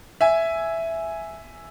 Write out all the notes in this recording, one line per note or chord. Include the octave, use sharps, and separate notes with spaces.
E5 G#5